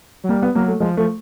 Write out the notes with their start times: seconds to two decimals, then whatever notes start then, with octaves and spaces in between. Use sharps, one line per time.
0.24 F#3
0.29 G3 A#3
0.42 B3
0.55 F#3 A#3
0.68 A3
0.80 F3 G#3
0.97 F3 A3